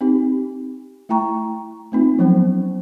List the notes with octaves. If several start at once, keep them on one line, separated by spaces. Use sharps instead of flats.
C4 D#4 G4
A3 E4 G5 A#5 C#6
A3 C4 D#4 F4
F3 F#3 B3 C#4 C5